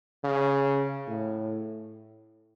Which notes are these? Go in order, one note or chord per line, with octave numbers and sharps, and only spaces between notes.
C#3
A2